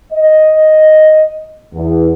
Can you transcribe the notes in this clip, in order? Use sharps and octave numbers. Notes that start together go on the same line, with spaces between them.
D#5
E2